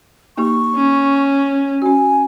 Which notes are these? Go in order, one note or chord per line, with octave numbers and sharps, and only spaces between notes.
A#3 D#4 G4 C#6
C#4
C#4 F#4 G#5